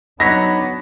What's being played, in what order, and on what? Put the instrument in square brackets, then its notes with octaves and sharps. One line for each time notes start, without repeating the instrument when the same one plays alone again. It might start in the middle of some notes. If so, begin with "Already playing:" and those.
[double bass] F#3 D4 [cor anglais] B3 [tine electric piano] D#4 C#5 F#5 [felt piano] A#6 B6